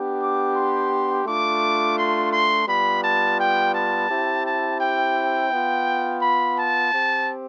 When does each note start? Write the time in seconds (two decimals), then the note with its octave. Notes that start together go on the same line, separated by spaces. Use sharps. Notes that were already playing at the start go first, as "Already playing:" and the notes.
Already playing: B3 D4 G4
0.19 D6
0.54 C6
1.26 A3 D4 F4 D6
1.97 C6
2.32 C6
2.67 G3 B3 F4 B5
3.02 A5
3.38 G5
3.74 A5
4.09 C4 E4 G4
4.45 A5
4.79 G5
5.51 B3 F4
6.22 B5
6.57 A5
6.93 C4 G4